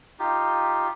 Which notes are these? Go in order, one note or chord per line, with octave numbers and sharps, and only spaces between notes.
D#4 F4 G4